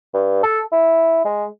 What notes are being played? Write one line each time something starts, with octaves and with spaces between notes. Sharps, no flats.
G2
A4
E4
G#3